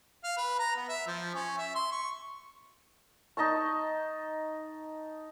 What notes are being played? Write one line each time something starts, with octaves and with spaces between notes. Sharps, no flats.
F5
B4
A#5
B3
E5
F3
C#4
E5
C6
C#6
D#4 D#5 A5 C#6